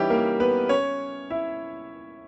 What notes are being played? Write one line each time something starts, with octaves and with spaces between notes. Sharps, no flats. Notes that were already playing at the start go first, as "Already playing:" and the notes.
Already playing: E3 G3 C#4 D#4 E4 G4
A#3 A#4
B3 B4
C#4 C#5
E4 E5